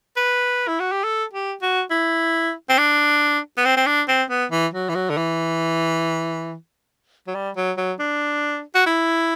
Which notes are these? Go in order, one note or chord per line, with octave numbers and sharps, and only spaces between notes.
B4
E4
F#4
G4
A4
G4
F#4
E4
C4
D4
B3
C4
C4
D4
C4
B3
E3
F#3
E3
F#3
D3
E3
F#3
G3
F#3
F#3
D4
F#4
E4